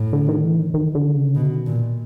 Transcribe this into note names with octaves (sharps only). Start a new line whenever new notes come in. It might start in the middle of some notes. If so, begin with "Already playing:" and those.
Already playing: A2
D3
D#3
E3
D#3
D#3
D3
C#3
B2 D3
D#3
A#2